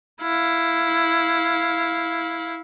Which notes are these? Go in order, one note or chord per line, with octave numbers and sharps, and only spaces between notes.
E4 F5